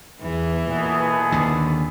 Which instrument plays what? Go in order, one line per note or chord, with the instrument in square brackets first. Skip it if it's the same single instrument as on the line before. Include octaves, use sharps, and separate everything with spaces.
[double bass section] E2 [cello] E3
[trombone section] B1 B3 G#4 [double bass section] A#2
[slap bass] D#2 D3